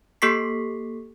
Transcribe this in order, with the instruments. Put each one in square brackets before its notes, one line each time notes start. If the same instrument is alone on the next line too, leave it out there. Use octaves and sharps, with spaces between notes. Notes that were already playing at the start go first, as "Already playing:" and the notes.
[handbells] A#3 G4 A4 C#6 B6 C7